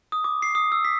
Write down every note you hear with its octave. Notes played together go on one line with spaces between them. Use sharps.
D#6
D6
C7
D#6
E6
B6